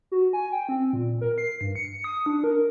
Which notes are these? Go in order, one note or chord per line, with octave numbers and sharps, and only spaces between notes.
F#4
G#5
G5
C4
A#2
A#4
C7
G2
C#7
D#6
D4
A#4